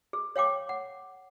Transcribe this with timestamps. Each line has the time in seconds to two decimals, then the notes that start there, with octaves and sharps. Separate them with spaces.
0.13 G#4
0.36 C#5 F5 G5 D6
0.69 F#5